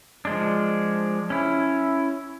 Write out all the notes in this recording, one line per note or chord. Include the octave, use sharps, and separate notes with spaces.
F3 G#3 D4
C#4 E4